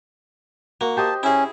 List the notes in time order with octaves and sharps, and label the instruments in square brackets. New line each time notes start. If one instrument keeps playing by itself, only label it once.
[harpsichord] A#3 [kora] F#4
[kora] G4 C5 D#5 [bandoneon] A5
[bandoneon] C#4 [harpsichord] E4 G#4